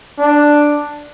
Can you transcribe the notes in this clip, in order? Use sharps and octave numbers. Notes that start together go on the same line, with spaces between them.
D4